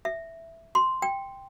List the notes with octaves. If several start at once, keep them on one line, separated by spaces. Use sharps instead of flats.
E5
C6
G5